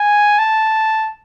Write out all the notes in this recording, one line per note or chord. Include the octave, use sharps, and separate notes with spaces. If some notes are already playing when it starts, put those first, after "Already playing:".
Already playing: G#5
A5